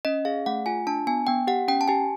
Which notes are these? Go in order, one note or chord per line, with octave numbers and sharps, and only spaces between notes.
C#4 D#5
G#4 F5
A3 F#5
F4 G#5
D4 A5
B3 G#5
B3 G5
G4 F#5
C#4 G5
A5
G4 G#5